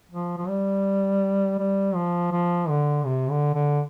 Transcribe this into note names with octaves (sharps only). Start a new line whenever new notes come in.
F3
F3
G3
G3
F3
F3
D3
C3
D3
D3